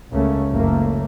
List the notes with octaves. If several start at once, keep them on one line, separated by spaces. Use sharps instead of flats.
C#2 C#3 A3 A#3 C#4
F#1 C#2 F#2 A3 A#3